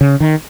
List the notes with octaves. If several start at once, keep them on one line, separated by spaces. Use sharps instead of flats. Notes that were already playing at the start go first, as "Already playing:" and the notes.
C#3
D#3